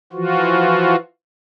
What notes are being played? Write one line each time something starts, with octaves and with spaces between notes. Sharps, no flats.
E3 F3 F4 F#4